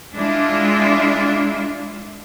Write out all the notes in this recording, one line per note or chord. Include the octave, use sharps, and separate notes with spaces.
G#3 D4 E4 F4